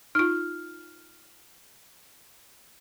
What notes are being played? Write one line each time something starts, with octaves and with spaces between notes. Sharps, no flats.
D#4 F4 F6